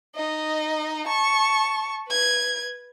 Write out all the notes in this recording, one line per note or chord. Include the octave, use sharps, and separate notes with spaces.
D#4 D#5
A5 C#6
B4 G#6